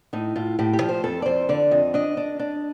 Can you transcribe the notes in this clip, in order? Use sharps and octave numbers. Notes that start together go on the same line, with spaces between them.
A2 D#4
A2 F4
A2 G4
G4
F3
C5
F2 A4
D5
F2 C5
D3 D5
F2 D#5
D4 D#5
D4
D4